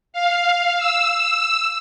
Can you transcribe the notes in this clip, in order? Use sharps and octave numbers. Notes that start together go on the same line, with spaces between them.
F5
E6